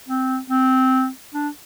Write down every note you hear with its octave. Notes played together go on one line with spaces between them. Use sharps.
C4
C4
D4